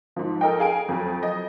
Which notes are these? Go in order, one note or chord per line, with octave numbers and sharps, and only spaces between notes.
G#2 F3
A4 A#4 D#5 G5
G#4 F5 G#5 D7
F2 F#3
D#5